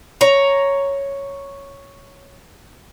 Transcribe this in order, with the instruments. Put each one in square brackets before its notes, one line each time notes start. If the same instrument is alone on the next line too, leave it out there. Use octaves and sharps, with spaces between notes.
[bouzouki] C#5 A#5